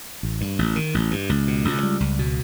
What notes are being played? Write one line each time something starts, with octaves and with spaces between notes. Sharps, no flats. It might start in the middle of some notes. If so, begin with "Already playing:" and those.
A1
G2
A1
D#3
A1
G2
C#2
B2
C#2
G3
C#2
B2